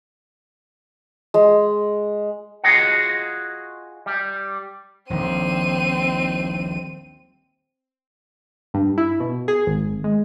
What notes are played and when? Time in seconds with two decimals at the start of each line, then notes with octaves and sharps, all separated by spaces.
1.34 G#3
2.64 F4 F#4 G#4 D#5 F#5
4.06 G3
5.10 D#1 A#1 D#3 C4 D#7
8.74 G2
8.98 E4
9.20 B2
9.48 G#4
9.67 G#1
10.04 G#3